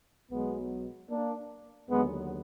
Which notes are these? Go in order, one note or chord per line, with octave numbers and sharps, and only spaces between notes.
B1 B2 F#3 G#3 B3
A#3 D4
D#2 D3 F#3 G#3 B3